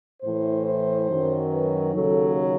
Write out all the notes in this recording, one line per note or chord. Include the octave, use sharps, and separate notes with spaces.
A2 E3 C5
C5
F#2 D#3 F#3
B4
D#2 C#3 F#3 A4